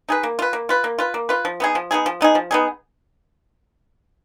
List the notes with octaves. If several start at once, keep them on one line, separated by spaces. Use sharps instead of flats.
D#4 G#4 B4
A#3
F4 B4
A#3
F4 B4
A#3
F4 B4
A#3
F4 B4
F3
B3 D#4 G#4
F3
B3 D#4 G#4
F3
B3 D#4 G#4
F3
B3 D#4 G#4